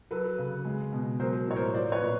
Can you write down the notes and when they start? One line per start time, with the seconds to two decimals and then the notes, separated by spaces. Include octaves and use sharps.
0.11 F#3 A4 B4
0.38 C#3
0.65 G#3
0.92 B2
1.20 F#3 A#4 C5
1.47 A2 C#5
1.56 A#4 C5
1.74 F3 C5 D5
1.92 B4 C#5
2.01 A#2